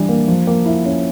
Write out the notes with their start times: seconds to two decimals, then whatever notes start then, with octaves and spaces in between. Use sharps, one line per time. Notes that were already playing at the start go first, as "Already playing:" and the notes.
Already playing: E3 G3 D4
0.09 A#3
0.28 F3
0.47 A#3
0.66 E4
0.86 C#4